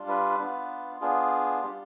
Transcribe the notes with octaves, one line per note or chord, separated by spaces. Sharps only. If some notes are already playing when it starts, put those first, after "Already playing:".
Already playing: G3 D4 F4
B4
B3 D4 F4
B3 D4 F4 G#4
G3 D4 F4 G4